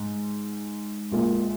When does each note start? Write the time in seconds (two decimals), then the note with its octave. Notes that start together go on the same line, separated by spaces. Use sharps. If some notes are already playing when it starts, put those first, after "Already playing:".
Already playing: G#2
1.11 A#1 A#2 G#3 F4